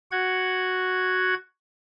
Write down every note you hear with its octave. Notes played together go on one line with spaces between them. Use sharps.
F#4 F#5 G#6